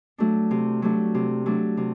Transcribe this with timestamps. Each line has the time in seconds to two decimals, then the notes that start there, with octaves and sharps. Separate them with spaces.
0.18 F#3 A3 D4
0.51 C3
0.82 F#3 A3 D4
1.14 C3
1.46 F#3 A3 D4
1.77 C3